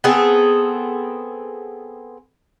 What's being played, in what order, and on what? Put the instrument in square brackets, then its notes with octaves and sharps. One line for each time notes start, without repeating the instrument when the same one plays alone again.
[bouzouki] B3 C4 G#4 A4